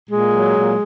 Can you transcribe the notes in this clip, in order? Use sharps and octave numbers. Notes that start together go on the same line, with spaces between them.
A#2 G#3
F#3
A#2